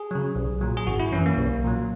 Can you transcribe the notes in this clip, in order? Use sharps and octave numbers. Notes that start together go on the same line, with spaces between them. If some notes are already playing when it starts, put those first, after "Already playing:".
Already playing: G#4
C#3 F#3
B1
A#2 F#3
G#4
G#1 F#4
E4
F#2 E3 C#4
A#3
B1
A#2 F#3